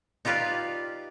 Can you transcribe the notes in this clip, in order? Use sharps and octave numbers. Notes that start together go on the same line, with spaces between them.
D#4 F4 G4 B4 D5 F5